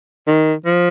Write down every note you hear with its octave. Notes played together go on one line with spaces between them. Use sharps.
D#3
F3